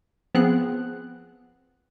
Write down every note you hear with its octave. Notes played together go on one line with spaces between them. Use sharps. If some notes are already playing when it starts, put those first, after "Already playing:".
F3 B3 C4 G#4 F#6